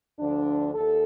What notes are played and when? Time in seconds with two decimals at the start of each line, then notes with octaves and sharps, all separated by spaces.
0.19 D2 D3 F3 D4
0.74 D#2 A4